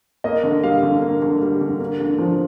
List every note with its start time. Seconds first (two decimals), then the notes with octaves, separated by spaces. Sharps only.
0.24 A#3 D#5
0.43 D3
0.63 G3 F5
0.83 D3
1.02 A#3
1.22 D3
1.41 G3
1.61 D3
1.80 A#3
2.00 D3
2.19 F3